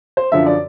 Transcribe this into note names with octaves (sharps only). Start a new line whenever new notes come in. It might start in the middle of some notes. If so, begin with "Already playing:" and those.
C5
F#2 D3 F3 E5
D5